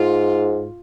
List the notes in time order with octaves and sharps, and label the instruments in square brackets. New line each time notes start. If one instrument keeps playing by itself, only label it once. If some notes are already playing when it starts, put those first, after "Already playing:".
Already playing: [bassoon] G#2 [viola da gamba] F4